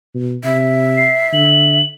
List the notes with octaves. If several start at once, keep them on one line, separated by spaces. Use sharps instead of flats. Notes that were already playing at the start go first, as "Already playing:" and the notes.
B2
C3 E5
C7
D3 F#7